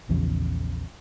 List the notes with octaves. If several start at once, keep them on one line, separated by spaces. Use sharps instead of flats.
A#1 E2 C#3 F3